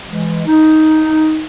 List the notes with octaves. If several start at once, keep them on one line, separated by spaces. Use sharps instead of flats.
E3 G#3
D#4